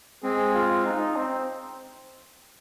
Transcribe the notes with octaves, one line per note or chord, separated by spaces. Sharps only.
G#3 C4 G#4
F4
D#4
C4